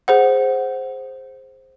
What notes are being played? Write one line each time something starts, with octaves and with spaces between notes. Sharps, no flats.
G#4 C5 F#5